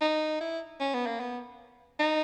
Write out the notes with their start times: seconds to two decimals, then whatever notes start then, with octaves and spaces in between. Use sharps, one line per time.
0.01 D#4
0.41 E4
0.80 C#4
0.94 B3
1.06 A#3
1.20 B3
2.00 D#4